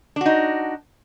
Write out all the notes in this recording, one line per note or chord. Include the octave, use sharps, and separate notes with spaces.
D4 D#4 F#4